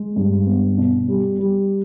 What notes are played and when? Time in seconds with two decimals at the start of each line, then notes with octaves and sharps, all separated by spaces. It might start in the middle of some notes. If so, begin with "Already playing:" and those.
Already playing: G#3
0.16 G2
0.47 B3
0.78 B2
1.08 G3
1.39 G3